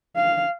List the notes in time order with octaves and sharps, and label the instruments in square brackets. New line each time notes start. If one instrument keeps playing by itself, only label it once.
[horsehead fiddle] F5